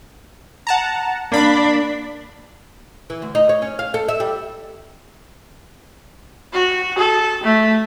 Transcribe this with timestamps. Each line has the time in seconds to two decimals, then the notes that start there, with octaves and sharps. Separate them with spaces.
0.67 F#5 A5 A#5
1.32 A#3 D4 B5 B6
3.10 E3
3.22 D2
3.35 D#4
3.49 C#5
3.62 C#4
3.79 F5
3.94 A4
4.08 E5
4.20 G3
6.53 F#4
6.98 A4
7.44 A3